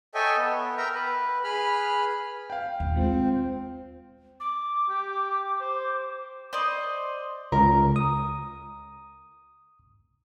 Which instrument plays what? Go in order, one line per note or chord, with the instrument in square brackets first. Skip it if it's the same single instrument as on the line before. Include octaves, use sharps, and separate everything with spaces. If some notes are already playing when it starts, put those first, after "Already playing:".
[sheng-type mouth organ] A4 C#5 D#5 E5 G5 G#5
B3
A#4 E5 G5 A#5
B4
G#4 B4 B5 F6
[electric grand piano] F5 G5
[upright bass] D#2 A#2
[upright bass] G3 [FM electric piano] G#3 F4 [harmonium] C4
[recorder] D6
[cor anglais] G4
C5
[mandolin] C5 D5 D#5
[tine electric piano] C#2 [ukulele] A#4
[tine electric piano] D#6